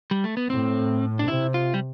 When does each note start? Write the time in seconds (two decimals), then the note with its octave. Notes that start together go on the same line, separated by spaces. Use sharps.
0.11 G3
0.24 A3
0.37 B3
0.49 A2 C4
1.19 D4
1.27 C3 E4
1.54 F4
1.74 G3